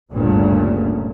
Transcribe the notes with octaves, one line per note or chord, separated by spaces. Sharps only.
G1 D2 G2 A#2 C#3